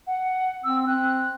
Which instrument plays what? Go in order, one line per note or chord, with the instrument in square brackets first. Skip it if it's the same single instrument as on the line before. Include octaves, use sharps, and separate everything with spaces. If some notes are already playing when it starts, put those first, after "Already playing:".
[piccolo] F#5
[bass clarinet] C4 [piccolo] E6
[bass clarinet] C4 [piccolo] F#6